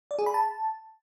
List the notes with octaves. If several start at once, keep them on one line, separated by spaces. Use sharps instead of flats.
D5
G#4
B5
A5